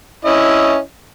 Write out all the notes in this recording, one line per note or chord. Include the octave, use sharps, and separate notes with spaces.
C#4 E4 D#5